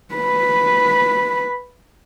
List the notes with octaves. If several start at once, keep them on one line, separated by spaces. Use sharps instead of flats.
B4 B5